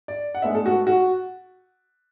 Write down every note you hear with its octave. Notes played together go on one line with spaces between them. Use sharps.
D5
F#5
A2 G#3 B3 D4 E5
A4
F#4
F#4